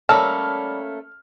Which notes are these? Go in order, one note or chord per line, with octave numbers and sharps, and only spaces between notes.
G3 A3 A#3 C#4 A4 A#4 A5 F6